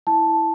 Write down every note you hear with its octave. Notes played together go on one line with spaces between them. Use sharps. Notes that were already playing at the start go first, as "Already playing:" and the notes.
E4 A5